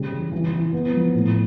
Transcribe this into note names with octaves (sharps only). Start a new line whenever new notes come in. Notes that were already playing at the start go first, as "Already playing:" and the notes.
Already playing: C#3 G3
E3
E3
E3
B3
F3
A2